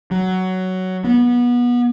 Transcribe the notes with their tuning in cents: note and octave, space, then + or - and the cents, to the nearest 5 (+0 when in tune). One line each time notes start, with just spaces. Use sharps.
F#3 +10
B3 -25